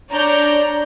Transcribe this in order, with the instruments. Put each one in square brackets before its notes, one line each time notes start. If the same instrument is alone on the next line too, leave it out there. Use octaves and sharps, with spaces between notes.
[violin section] D4 C#5 D5 A#5 G6